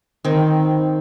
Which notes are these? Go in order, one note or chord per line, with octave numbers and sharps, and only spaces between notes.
D#3 C4